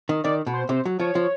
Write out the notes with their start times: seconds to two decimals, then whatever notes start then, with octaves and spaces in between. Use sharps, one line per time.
0.09 D#3
0.24 D#3 D5
0.47 B2
0.54 C5
0.69 C3 C5
0.85 F#3
1.00 F3 C#5
1.15 F3